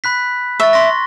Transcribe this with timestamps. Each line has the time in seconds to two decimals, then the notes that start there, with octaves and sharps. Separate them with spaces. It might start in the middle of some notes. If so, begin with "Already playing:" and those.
0.04 B5 F#6 B6
0.60 E5 C#6 A6
0.73 C6 A#6